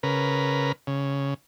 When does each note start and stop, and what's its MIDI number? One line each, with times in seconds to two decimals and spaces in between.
0.03 0.72 49
0.03 0.72 70
0.03 0.72 71
0.87 1.34 49